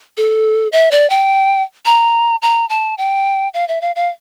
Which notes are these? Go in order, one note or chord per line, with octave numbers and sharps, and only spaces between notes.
A4
E5
D5
G5
A#5
A#5
A5
G5
F5
E5
F5
F5